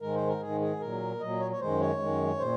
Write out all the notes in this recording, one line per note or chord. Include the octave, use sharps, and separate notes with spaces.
G#2 D#3 G#3 A#4
C5
A#4
G#2 D#3 G#3 G#4
G#4
A#2 F#3 A#4
A#2 F#3 D#5
C#5
C#5
F#2 D#3 G#3 C5
C#5
F#2 D#3 G#3
A#2 C5